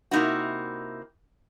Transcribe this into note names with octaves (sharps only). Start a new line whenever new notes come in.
C3 A#3 D#4 E4 F#4